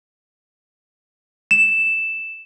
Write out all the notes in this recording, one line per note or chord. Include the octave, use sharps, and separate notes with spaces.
E7